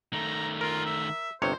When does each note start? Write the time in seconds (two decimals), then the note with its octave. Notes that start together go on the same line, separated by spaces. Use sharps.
0.13 D#3 A3 A#5
0.61 F4 A#4
0.85 E5
1.42 G1 C3 C5 C#5